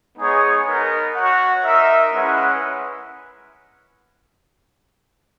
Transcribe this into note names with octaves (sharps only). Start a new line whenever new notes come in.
G#3 B3 D#4 G#4 C#5
B3 D#4 A#4
F#4 C#5 F#5
D#4 A#4 E5
G#3 C#4 E4 B4 F#5